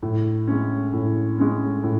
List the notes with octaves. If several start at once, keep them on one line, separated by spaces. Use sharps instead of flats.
A2
G#3 C#4
A2
G#3 C#4
A2